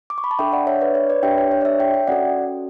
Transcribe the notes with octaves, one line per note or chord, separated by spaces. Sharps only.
D6
C#6
B5
A5
D4 A4 E5 G5
D5 F#5
C#5 E5
B4 D5
C#5
B4 D5
D4 G4 E5 G5
C#5
C#5
D5
C#5 E5
E5 G5
E5 G5
C#4 F#4 A4 D5 F#5